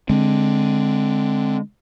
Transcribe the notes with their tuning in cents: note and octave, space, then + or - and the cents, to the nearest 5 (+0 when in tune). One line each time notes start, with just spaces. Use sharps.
D3 +0 G#3 +0 C4 +5